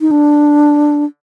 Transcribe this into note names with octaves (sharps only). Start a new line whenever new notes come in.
D#4
D4